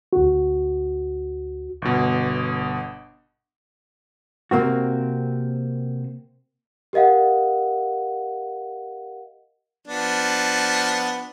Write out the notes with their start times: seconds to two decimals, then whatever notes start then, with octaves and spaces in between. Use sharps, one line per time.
0.13 D2 F#4
1.82 G1 B2
4.51 C3 A#3 C4 F#4
6.93 G4 A#4 D#5 F5 F#5
9.88 F3 B3 D4